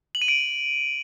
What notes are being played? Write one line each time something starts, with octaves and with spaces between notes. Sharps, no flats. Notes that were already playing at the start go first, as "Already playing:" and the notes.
F#7
D#7
D7